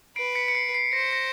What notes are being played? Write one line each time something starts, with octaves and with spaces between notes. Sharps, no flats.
B4 C7 D7
B6 C#7
C#7
C7
C7
C5 A#6
A#6